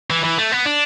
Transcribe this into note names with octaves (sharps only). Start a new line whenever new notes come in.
E3
E3
A3
B3
D4